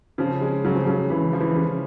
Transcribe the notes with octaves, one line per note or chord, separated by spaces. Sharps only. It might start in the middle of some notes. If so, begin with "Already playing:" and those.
C#3 F3
G#3
C#3 F#3
F3
C#3 F#3
C#3 E3
F3
E3
C#3